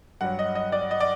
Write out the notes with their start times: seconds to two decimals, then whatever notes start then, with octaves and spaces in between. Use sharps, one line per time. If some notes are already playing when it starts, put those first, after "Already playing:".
0.21 G2 F#3 F#5
0.39 D#5
0.55 D#5
0.72 D5
0.91 D#5
1.00 D5